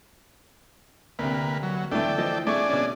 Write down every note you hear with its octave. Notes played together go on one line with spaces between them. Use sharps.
D2 C3 A#3 B4
F#3
D2 E3 A3 A4 D5 G5
E3 F3 D#5
A3 D4 G#4 D5 C#6
B2 C#4